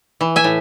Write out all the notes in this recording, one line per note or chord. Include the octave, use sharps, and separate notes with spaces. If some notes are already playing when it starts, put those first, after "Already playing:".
E3
E5 G#5
A2